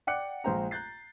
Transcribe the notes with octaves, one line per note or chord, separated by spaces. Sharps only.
D5 F#5 G5 D6 F#6 C#7
A#1 G#3 C5 G5 A#5
A#5 F#6 G6 A6 C7